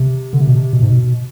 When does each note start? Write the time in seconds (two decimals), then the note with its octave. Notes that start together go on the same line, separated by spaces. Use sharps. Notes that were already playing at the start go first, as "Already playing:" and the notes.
Already playing: C3
0.33 D3
0.40 C3
0.47 B2
0.56 C3
0.73 B2
0.82 G#2
0.90 B2